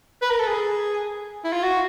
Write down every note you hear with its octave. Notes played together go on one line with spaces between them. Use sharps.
B4
A#4
A4
G#4
E4
F4
F#4